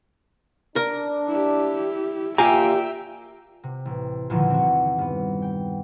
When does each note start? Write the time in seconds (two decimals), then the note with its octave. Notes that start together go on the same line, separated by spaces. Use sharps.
0.76 D4 A#4
1.28 E4 G4
2.38 A#2 F4 G4 E5 F5 G5 G#5 A#5
3.63 C3
3.85 A1
4.30 E2 A#2 D3 D#3 F3
4.50 C4 F#4
4.98 G2 B3
5.42 G5